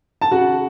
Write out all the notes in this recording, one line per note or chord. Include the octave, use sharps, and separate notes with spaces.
A5
C#3 F#4 F#5